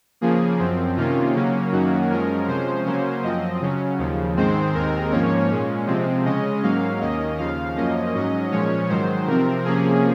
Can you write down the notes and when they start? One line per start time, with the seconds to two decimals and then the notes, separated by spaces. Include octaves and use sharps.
0.21 C#3 F3 A#3 G#4
0.59 F#2 F3 C4
0.97 C3 D#3 A#3 C#4 F4
1.35 C#3 F#3 A#3 C#4
1.72 F#2 D#3 F#3 A#3 C#4 F#4
2.10 F#2 F3 G#3 C#4 A#4
2.48 C3 F3 G#3 C#4 C5
2.86 C#3 F#3 A#3 C#4 C5
3.23 F#2 F3 C4 D#5
3.61 C#3 F#3 C#4
3.99 D#2 C#3 F3
4.36 G#2 D#3 G#3 C4 C5
4.74 D#2 D#3 G#3 C4 A#4
5.12 G#2 F3 A#3 C#4 C#5
5.49 A#2 G#3 C#4
5.87 C3 F3 G#3 C4
6.25 C#3 G#3 C#4 D#5
6.63 G#2 F#3 A#3 C#4 F5
7.01 D#2 D#3 A#3 C#4 D#5
7.38 D#2 C#3 F3 F5
7.76 F#2 F3 A#3 C#4 D#5
8.14 G#2 F#3 C#4 D#5
8.51 A#2 F3 G#3 C#4 C#5
8.89 G#2 D#3 F#3 C5
9.27 C3 F3 C4 A#4
9.65 C3 F3 A#3 C#4 G#4